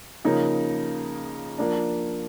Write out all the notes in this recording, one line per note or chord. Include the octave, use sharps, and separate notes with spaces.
C#3 F3 A#3 D#4
F3 A#3 D4